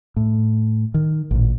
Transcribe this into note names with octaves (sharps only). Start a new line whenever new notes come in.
A2
D#3
A1 A#2